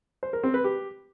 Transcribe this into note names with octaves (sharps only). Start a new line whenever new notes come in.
C5
A#4
C4
B4
G4